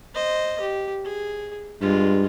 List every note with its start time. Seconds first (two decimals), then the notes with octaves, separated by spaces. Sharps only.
0.15 C5 D#5
0.61 G4
1.05 G#4
1.82 G2 G#3 F4